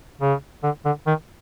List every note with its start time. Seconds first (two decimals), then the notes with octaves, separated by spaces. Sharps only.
0.21 C#3
0.63 D3
0.85 D3
1.06 D#3